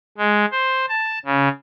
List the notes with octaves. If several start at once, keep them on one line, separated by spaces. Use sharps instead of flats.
G#3
C5
A5
C#3